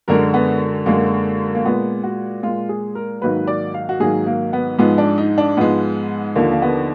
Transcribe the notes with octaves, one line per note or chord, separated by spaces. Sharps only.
F#2 D3 G#3 A#4
B3
F#2 D3 G#3 A#3
A#3
A#2 G#3 B3
F#4
A#2 G#3 F4
G#4
A#4
G#2 D#3 F#3 A#3 B4
D5
F5
F#4
G#2 D#3 F#3 A#3 G#4
A#3
B3
G#2 F3 G#3 B3
D4
D#4
D4
G#2 F3 G#3 B3
D#2 D3 F3 A#3
A#3
B3